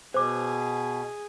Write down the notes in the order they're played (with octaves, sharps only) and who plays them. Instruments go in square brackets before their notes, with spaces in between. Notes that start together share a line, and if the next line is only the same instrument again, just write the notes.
[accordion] B2 [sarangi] G#4 [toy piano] C5 D6